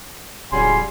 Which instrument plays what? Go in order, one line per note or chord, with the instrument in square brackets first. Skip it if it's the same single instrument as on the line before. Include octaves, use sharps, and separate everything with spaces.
[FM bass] D1 [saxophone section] C#3 F#3 G3 [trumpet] G#5 [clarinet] C6